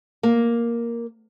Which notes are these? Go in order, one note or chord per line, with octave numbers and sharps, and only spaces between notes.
A#3